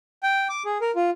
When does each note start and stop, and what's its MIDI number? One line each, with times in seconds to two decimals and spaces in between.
0.23 0.48 79
0.49 0.63 86
0.65 0.78 68
0.81 0.91 70
0.96 1.10 65